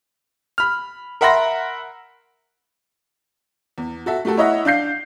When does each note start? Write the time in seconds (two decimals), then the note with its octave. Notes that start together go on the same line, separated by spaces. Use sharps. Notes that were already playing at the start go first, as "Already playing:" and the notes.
0.58 B5 F6
1.21 A#4 E5 F#5 B5 C6 A#6
3.78 E2
4.06 F#4 A4 E5
4.25 A3 F#4 G4 A4
4.37 E4 C#5 D#5 E5 F#5
4.65 D4 F5 G6 C7